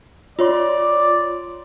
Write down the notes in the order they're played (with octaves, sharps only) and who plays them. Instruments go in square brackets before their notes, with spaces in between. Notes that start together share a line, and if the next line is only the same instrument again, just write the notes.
[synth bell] F4 C#5 C6 [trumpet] D5